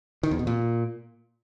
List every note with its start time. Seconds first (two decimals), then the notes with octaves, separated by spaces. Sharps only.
0.23 D#3
0.31 E2
0.39 B2
0.47 A#2